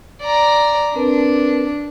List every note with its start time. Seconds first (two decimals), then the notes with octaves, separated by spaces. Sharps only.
0.23 D5 A#5
0.96 C4 D4 A#4 B4